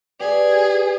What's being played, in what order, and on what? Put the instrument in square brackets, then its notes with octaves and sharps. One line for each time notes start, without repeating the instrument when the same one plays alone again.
[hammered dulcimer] G4 [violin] G#4 [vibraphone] B4 [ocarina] D5